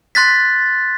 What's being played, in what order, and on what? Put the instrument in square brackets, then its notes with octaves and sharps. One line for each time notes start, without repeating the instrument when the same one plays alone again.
[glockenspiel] C6 F#6 A6 B6